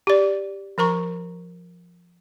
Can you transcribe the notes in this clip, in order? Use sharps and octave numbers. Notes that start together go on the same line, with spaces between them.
G4 D5
F3 A#4 A#5 C#6